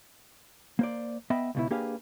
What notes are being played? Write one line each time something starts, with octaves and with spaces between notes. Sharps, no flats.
A#3 C5 D5
B3 D#5 E5 G5 B5
C#2 B2 E4
A#3 D4 G4 G#4 B4 F5